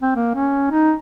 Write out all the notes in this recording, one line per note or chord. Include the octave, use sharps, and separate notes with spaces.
C4
A#3
C#4
D#4